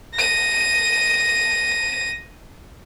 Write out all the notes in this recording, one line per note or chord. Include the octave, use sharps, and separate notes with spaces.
A#6 D#7